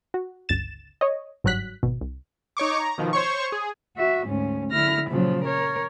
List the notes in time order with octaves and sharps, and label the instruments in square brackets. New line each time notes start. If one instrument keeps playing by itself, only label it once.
[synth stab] F#4
G1 C#2 A6 E7
C#5 D#5
G1 G#2 F#3 G3 F#6 B6
G#1 B2
C2
[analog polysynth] D#4 C#5 C#6 D6
A#5
B2 D#3 F3
C5 C#5 C#6
G#4
[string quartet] F#4 E5
D2 G#2 C#4
D3 E4 F6 A#6
A#2 C#3 F3 F#3
A#4 C#5